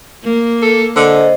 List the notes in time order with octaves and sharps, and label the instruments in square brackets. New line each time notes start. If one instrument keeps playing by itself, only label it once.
[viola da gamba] A#3
[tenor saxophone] A4
[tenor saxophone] D3 [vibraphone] C5 D#5